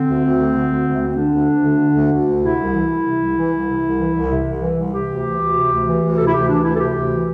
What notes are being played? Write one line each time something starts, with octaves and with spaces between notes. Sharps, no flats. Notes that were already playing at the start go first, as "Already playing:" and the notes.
Already playing: D3 C4
D2
D2
D3
D3
D2
D2
A3
D3 C4
D3 D4
D2
D2
D3
D3
D2
D2
D3
C3 E4
C2
E3
C2
C3
C2
E3
C2
C3
C2
E3
C2
C3
C2
E3
C2
C3 G4
D2
E3
D2
C3
D2
E3
D2
C3 A4
E4
D2 G4
E3 D4
D2 E4
A4
C3 G4
D2
E3